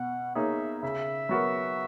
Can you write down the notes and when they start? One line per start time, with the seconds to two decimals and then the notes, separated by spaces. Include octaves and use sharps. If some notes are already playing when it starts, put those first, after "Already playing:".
Already playing: B2 F#5
0.35 A#3 D#4 G#4 C#5 E5
0.83 C#3 E5
1.29 F#3 B3 F#4 A#4